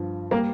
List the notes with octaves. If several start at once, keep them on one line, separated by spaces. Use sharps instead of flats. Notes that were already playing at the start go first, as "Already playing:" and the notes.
Already playing: G2 F3
G3 A#3